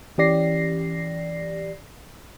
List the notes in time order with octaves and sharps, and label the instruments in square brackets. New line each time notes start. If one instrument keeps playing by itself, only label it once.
[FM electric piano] E3 C#4 G4 D5 A#6 C7